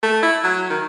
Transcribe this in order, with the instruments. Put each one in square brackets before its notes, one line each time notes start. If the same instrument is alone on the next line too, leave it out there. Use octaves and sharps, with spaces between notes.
[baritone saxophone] A3
E4
F#3
D#3